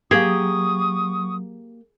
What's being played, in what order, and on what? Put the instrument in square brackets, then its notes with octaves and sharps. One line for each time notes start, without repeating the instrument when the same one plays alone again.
[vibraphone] F#3 [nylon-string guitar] A#3 G4 [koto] G#4 [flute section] C#6 D#6